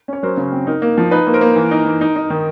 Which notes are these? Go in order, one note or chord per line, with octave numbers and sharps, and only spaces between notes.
C#4 C#5
F#3 A#4 C5
C#3
C4
D#4 A#4
A#3
F3
D#4 B4
A#3
A#4 C5
A#3
E3
D#4
E3
D#4
D#4
D#3